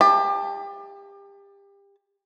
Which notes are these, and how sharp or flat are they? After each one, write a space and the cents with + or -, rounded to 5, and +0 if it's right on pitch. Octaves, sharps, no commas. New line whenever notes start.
G4 +30 A5 +0